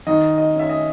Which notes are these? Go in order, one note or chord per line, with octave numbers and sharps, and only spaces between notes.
D#3 D#5
D#5
C#4 E5
D#5